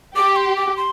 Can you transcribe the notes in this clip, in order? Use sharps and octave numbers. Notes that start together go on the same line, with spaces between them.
G4 D6
C6
D6
C6